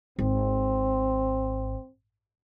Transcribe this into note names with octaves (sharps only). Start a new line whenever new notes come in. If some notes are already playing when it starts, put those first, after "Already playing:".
G#1 C4